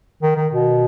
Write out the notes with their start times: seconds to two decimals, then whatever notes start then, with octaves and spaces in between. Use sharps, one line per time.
0.23 D#3
0.36 D#3
0.52 B2